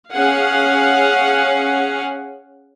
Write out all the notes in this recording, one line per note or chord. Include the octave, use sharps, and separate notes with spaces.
C#4 G#4 F5 F#5 G#5